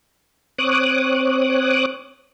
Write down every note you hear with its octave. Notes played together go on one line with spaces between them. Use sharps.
C4 C#5 D6 D#6 F#6